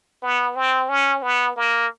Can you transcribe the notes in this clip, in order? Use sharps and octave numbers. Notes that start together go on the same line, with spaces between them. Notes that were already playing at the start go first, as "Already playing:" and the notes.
B3
C4
C#4
B3
A#3